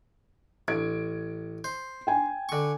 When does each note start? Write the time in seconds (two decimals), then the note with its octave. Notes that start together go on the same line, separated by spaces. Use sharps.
0.68 A1 G#6 D7
1.64 C5
2.07 G5 G#5
2.49 D3 C#6